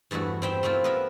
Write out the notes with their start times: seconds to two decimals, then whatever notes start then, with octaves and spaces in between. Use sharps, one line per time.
0.11 E2 G2 A3 E4 F#4
0.42 C4 E4 E5 G5
0.63 A3 A#3 C4 E4 F4
0.84 B3 A#4 E5